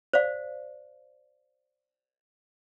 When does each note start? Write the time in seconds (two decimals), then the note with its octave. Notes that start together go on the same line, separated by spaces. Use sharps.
0.13 C5 D5 F5